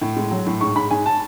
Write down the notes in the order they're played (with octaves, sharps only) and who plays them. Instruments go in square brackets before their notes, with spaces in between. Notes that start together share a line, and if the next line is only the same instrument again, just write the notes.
[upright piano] A2
G#3
F#3
A2
G#2 C#6
G#2 B5
G#2 G#5
A5